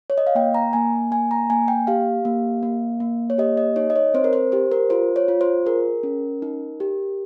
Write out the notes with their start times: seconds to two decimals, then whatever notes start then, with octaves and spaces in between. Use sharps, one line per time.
0.10 C#5
0.18 D#5
0.27 F5
0.35 A#3 G5
0.55 A#5
0.73 A#3 G#5
1.11 A#3 G#5
1.31 A#5
1.50 A#3 G#5
1.68 G5
1.87 G4 F5
2.25 A#3
2.63 A#3
3.00 A#3
3.30 C#5
3.38 G4 D#5
3.57 D#5
3.76 D#4 C#5
3.90 D#5
3.96 C#5
4.14 C4 C5
4.24 A#4
4.33 C5
4.52 G4 C5
4.72 A#4
4.90 F4 C5
5.16 C#5
5.28 F4
5.41 C5
5.66 G#4 A#4
6.03 C#4
6.42 D#4
6.80 G4